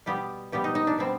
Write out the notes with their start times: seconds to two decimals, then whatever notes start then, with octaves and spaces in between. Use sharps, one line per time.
0.06 B2 G3 B3 G4
0.52 B2 G3 B3 G4
0.64 D#4
0.75 D#4
0.87 D4
0.98 B2 G3 B3 C4